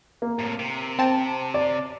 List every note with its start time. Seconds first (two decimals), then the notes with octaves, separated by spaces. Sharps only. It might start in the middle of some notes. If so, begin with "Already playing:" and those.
0.22 A#3
0.39 A2 C3
0.59 C3
0.99 C4 A5
1.54 D5